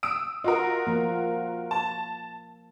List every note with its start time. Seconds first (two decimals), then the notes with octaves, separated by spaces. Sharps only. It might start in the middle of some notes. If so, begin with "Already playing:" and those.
0.03 D#6 E6 D7
0.44 F4 F#4 A#4 D#5
0.87 F3 A#3
1.71 A5